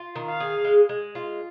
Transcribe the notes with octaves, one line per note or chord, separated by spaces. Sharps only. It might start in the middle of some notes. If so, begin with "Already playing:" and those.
Already playing: F4
D#3
F5
G#4
G#3
G#3
F4